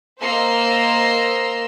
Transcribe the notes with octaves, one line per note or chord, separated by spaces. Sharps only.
A#3 C5 D#5 A#5 C6 E6